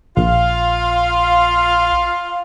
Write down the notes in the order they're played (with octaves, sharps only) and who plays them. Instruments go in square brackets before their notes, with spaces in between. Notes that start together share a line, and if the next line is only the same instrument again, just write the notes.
[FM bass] A#1 [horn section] F4 F5